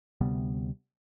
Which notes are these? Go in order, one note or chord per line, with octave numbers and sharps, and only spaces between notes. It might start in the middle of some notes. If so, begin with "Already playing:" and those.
D2 C3 G3 B3